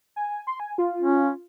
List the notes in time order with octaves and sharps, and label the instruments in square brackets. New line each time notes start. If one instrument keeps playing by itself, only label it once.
[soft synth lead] G#5
C6
G#5
F4
[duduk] C#4